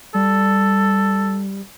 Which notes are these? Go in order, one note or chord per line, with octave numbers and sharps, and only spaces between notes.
G3 A4